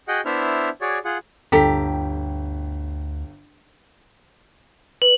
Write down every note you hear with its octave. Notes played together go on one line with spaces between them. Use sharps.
F#4 G#4 D#5 F#5 G5
B3 D4 E4 C5 E5 F6
F#4 G#4 C#5 D5
F4 G#4 F#5
G1 D2 G4 A4 G5 A#5 B6
B4 F#7